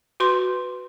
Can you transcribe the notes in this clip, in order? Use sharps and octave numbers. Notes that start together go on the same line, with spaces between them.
F#4 B4 C6